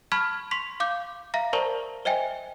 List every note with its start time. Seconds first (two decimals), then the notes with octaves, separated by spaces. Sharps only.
0.12 A5 B5 C#6 F6 G#6 B6
0.51 C6 C#6 B6
0.80 F5 D6 G6
1.34 E5 F5 A#5 A#6
1.53 A#4 C5 D5 A5 A#5 C#6
2.05 C5 D#5 E5 G5 G#5